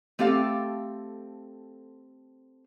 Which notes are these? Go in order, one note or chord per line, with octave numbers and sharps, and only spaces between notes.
A3 C4 G4 A4 F5